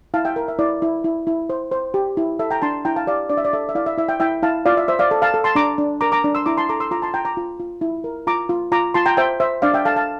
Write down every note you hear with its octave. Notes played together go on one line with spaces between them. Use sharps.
E4 F5 A5
E5 G5
A#4
E5
E4 D5
E4
E4
E4
C5
C5
G4
E4
A4 E5
G5 A#5
D4 A5 C6
E4 G5 A#5
F5 A5
G4 D5 F5
D4 D5
E5
D5
A4 E5
E5
E4 D5 F5
E5
E4 E5
E5 G5
E4 E5 G5
E4 F5 A5
F4 D5 F5
E5
C5 E5
D5 F5
A4
F5 A5
A4
A5 C6
D4 A#5 D6
D4
A#4 A#5 D6
A#5 D6
D4
C6 E6
E4 A#5 D6
A5 C6
A4 A#5 D6
C6 E6
F4 A#5 D6
A5 C6
F4 G5 A#5
A#5 D6
F4
F4
E4
A#4
F4 A#5 D6
F4
F4 A#5 D6
F4 A5 C6
G5 A#5
C5 E5 G5
C5 E5
D4 D5 F5
E5 G5
A4 F5 A5
F5 A5